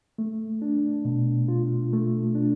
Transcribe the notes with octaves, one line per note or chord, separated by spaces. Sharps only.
A3
D4
B2
F4
A3
D4